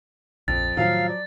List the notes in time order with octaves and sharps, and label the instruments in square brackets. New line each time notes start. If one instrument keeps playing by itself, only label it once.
[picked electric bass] A#1 [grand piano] F2 [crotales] A6
[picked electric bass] A2 D#3 [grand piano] F3 F#3 [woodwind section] F5
[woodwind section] D5